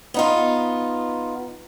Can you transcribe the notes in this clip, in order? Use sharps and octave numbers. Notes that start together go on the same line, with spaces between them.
B3 D#4 F4